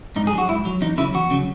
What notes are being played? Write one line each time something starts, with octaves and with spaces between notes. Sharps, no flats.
G#2 D#4
G#4
F#3
F#4
G#2 E4
F#3
E2 D#4
C#3 F#3 E4
E2 F#4
C#3 F#3